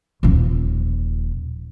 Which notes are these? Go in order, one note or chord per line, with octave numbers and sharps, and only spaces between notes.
D#1 F3